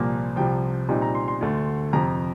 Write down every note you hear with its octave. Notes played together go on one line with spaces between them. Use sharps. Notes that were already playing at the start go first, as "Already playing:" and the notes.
Already playing: C2 A#2 F3 A#3
C2 C3 F3 G5
A#2 G3 C4 D#4
A#5
C6
C6
D2 D3 A3
F2 C3 F3 A#5